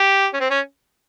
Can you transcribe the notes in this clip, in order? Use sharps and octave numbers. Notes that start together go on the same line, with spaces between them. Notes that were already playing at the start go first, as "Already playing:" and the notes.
Already playing: G4
C#4
C4
C#4